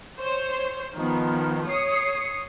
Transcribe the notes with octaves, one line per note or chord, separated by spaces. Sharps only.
C5 C#5
D#3 F3 B3
C#5 D#6 C7 C#7